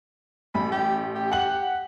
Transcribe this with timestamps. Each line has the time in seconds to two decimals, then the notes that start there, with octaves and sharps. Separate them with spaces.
0.55 A1 B5
0.72 G4
1.15 G4
1.31 F#5 F#7